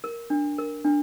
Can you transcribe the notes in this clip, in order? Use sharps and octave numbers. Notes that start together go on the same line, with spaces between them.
A#4
D4
A#4
D4